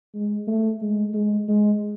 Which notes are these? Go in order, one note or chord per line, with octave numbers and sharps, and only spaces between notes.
G#3
A3
G#3
G#3
G#3